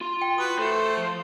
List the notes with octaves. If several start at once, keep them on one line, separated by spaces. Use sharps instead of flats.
F4 C6
G5
F#4 B4 D#6
A3 A4 C5
F3